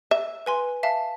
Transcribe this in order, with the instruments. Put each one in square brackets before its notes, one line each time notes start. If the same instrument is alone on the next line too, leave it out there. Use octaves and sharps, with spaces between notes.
[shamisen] E5
[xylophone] B4 G#5 C6
E5 F5 A5